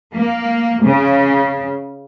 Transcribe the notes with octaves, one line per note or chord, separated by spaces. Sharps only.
A#3
C#3